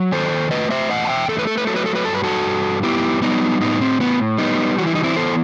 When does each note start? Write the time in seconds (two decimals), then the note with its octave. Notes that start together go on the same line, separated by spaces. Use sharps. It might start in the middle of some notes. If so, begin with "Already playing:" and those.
Already playing: F#3
0.12 D#3 A4 C5
0.51 A3 B4 D#5
0.70 C5 E5
0.89 E2 D#5 F#5
1.05 A5
1.09 E5 G5
1.29 A3 A4
1.39 B4
1.47 A4
1.58 B4
1.67 F#3 A4
1.76 B4
1.86 A4
1.95 B4
2.05 G2 A4
2.14 B4
2.24 F#4 A4
2.45 G2
2.83 B3 E4 G4
3.22 G3 B3 D#4
3.61 A2 B3 D#4
3.81 C4
4.00 A2 B3
4.38 G3 B3 D#4
4.78 E3 F#4
4.87 E4
4.95 D#4
5.03 C4 E4
5.16 B3 A4 C5